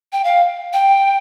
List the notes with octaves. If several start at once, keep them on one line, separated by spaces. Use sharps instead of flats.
G5
F5
G5